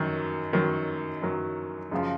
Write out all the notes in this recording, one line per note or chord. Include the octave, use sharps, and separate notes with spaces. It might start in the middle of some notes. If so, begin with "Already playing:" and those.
Already playing: F#2 D#3 F#3
F#2 D#3 F#3
F#2 D#3 F#3
F#2 C#3 F3